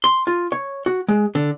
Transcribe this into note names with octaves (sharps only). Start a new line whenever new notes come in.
C6
F4
C#5
F#4
G#3
D3